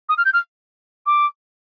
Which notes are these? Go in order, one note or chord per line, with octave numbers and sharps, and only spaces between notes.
D#6
F6
G6
F6
D6